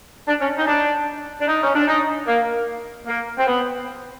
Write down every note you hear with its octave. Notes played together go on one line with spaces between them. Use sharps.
D4
C#4
D#4
D4
D4
D#4
C#4
D4
D#4
A#3
A#3
C4
B3